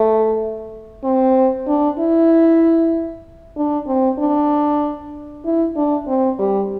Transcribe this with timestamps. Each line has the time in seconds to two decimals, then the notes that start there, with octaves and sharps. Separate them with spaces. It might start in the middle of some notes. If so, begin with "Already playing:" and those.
Already playing: A3
1.04 C4
1.67 D4
1.99 E4
3.56 D4
3.87 C4
4.19 D4
5.45 E4
5.76 D4
6.07 C4
6.39 G3